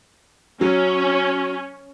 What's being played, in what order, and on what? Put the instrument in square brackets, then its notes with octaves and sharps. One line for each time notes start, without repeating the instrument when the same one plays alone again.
[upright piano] F#3 [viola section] C#4